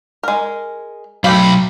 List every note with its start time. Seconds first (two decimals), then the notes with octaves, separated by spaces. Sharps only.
0.23 G#3 A#4
1.24 B1 F#3 A3 G4 F5 B5